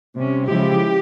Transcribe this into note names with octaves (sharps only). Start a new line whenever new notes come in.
C3 G3 C#4
C#3 F3 G#3 E4 G4